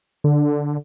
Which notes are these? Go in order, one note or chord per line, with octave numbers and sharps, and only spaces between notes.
D3